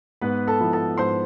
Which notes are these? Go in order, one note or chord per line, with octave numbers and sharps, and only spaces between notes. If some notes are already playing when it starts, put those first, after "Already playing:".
G#2 B3 B4
A4 A5
F3 B3 E4
A4 A5
G#2 C5 C6